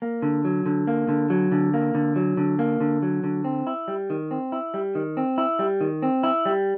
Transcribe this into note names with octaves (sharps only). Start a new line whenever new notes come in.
A#3
D3
F#3
D3
A#3
D3
F#3
D3
A#3
D3
F#3
D3
A#3
D3
F#3
D3
C4
E4
G3
D#3
C4
E4
G3
D#3
C4
E4
G3
D#3
C4
E4
G3